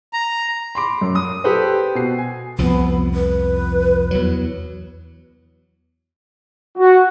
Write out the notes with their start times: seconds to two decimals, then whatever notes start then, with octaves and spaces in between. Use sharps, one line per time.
0.13 A#5
0.75 B5 C6 D6
1.01 F#2
1.15 D#6
1.44 G4 A4 B4 C5
1.95 B2 C7
2.18 G#5
2.58 C2 F2 F3 B3
3.14 B4
4.11 E2 F#3
6.78 F#4